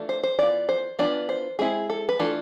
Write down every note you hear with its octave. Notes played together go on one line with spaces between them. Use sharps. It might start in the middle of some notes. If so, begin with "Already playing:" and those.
Already playing: E3 A3 D4 F4
C5
C5
E3 B3 F4 D5
C5
E3 B3 D4 F4 D5
C5
G#3 C4 E4 G#4
A4
B4
E3 A3 D4 F4 A4